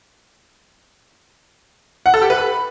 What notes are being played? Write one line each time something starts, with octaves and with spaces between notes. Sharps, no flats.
F#5
A4
G4
B4
B5